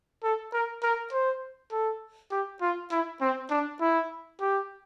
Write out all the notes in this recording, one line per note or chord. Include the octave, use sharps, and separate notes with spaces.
A4
A#4
A#4
C5
A4
G4
F4
E4
C4
D4
E4
G4